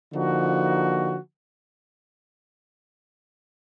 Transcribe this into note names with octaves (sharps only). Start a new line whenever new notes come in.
D3 F3 A#3 D#4 F#4